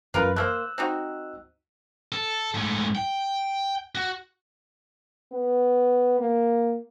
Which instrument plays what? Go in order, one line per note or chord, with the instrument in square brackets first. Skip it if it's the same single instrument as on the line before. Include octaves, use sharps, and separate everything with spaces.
[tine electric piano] G1 F#2 E3 [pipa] F4 A#4 B4
[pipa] A3 A#3 C5 [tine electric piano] E6 F#6
[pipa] C4 D#4 F#4
[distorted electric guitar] A4
G#2 A3
G5
F#4
[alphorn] B3
A#3